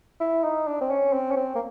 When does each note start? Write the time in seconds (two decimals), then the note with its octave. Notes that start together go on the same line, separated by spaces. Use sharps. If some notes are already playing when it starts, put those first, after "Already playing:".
0.20 E4
0.44 D#4
0.67 D4
0.81 C4
0.90 C#4
1.13 C4
1.31 C#4
1.36 C4
1.55 A#3